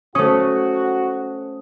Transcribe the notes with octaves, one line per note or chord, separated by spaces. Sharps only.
A3 C#4 F#4 C5 D#6